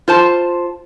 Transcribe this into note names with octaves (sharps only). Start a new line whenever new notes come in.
F4 C5 A5